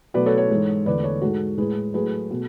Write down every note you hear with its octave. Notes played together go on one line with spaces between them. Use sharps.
B2 F#3 A3 B4 D5
A4 C#5
A4 C#5
G#2 E3 G#3
E2 D3 A3 B4 D5
A4 C#5
G#2 G#3 F#4 A4
A2 G#3 G#4 B4
A2 F#3 A3 G#4 B4
B2 A3